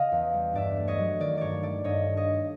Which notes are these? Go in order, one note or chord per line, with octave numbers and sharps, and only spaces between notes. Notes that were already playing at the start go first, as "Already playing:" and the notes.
Already playing: C#3 D#5 F5
E2
G3
G2 D5 E5
A3
C#5 D#5
F#3
D#3 D5
G2 C#5 D5
A3 D5
G2 C#5 D#5
D4
C#5 D#5
A3